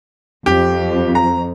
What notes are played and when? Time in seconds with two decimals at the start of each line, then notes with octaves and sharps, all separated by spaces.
0.46 F2 G4
1.15 A#5